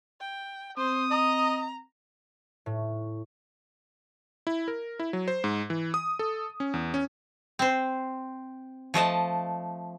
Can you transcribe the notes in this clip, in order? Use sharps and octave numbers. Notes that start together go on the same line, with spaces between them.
G5
C4 C5 D#6
D#5 A#5
A2
E4
A#4
E4
F#3
C5
G#2
E3
D#6
A4
C#4
E2
C#4
C4 C5
F3 A3 D#5 A5